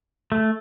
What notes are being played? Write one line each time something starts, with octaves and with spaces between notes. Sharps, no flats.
A3